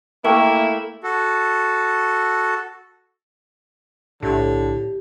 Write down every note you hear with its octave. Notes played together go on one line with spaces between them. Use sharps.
A3 A#3 E4 A#4 G5
F#4 A4
B1 A2 D3 G4